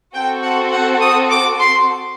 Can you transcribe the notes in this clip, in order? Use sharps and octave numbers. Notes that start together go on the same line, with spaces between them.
C4 F#4 A4 G5
F#5
F#5
D#6
D6
C6